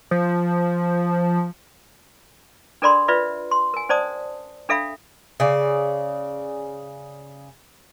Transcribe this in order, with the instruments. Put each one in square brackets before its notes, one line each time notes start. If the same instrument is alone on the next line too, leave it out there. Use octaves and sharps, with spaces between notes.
[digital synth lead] F3
[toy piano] D4 A4 A#4 D5 B5 C6
F4 B4 D5 E5
C6
A#4 G#5
C#4 C5 D5 A5 D#6
D4 A4 E5 F5 B5
[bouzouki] C#3 D5